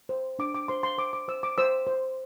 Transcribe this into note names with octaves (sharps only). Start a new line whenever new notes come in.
C5
D4 D6
D6
C5 C6
C6
C5 D6
D6
C5 E6
D6
C5 E6
C5